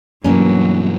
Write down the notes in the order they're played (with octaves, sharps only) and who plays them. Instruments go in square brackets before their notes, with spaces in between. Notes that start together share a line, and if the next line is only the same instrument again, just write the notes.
[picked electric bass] G2 B2 E3 [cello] F#3 [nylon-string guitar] A#3 C#4